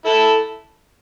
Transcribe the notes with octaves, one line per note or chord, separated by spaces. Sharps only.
E4 A4